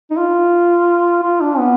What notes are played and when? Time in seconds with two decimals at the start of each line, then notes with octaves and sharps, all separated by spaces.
0.11 D#4
0.17 F4
1.23 F4
1.41 D4
1.58 B3